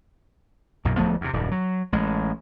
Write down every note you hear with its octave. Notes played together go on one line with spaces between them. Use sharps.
B1 F#2 A#2
D1 F3 A3 B3
E2 C3
D#1 F#2
F#3
A1 G#3